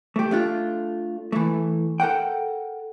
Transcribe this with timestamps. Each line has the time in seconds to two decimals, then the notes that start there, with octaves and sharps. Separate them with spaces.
0.16 A3 G4
0.31 A3 D4 F4
1.32 E3 A3
2.00 A4 A#4 F#5 G5